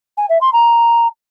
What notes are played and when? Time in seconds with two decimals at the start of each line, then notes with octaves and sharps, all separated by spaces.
0.17 G#5
0.29 E5
0.41 C6
0.53 A#5